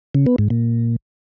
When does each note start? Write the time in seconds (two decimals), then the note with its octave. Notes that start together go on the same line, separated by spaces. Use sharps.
0.15 C#3
0.27 B3
0.38 G#2
0.50 A#2